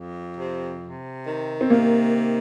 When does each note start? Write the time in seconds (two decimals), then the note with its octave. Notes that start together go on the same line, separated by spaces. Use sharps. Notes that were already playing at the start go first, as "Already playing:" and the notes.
Already playing: F2
0.38 C3
0.82 C3
1.26 D#3
1.61 C4
1.70 C3 A#3
2.14 D#3